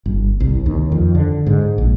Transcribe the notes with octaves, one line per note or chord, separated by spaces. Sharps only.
G1
C2
D#2
F2
D3
G#2
A#1